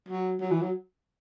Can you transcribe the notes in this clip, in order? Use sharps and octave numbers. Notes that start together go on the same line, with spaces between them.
F#3
F#3
E3
F#3